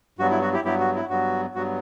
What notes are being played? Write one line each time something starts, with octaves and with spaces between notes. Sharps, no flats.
G2 F#3 B3 F#4
E4
F#4
E4 G4
G2 F#3 B3 E4 G4
F#4
E4
G2 F#3 B3 F#4
G2 F#3 B3 F#4